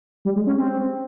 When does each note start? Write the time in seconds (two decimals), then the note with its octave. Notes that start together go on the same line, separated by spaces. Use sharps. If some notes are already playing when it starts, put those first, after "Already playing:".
0.25 G3
0.36 G#3
0.47 C#4
0.58 C4